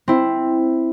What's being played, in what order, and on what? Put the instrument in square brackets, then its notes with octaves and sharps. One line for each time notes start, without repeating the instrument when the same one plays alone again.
[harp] C4 E4